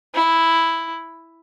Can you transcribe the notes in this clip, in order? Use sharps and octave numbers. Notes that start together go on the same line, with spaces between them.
E4